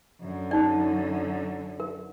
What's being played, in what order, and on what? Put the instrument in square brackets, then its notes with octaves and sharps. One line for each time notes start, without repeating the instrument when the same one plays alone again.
[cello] F#2 D3
[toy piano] D#4 D5
A#4